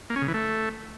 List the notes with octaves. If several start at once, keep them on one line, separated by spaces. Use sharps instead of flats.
A#3
C#4
C#3
E3
A3